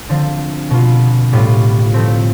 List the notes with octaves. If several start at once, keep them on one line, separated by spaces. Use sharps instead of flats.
D3 F3 C4 F4
B2 B3 F4
A2 G3 B3 F4
F3 A3 C4